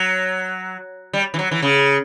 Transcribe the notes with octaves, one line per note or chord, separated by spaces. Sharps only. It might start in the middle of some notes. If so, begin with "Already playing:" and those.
Already playing: F#3
G3
E3
F#3
E3
C#3